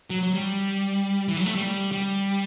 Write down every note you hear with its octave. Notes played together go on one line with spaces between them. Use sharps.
F#3
F#3
G3
E3
F#3
A3
G3
G3